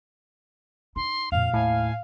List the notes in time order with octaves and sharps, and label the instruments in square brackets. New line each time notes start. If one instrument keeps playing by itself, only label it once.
[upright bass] D#4 [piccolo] C6
[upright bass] F2 A#2 [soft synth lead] F5 [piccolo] F7
[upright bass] D#2 [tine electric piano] A2 [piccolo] G#5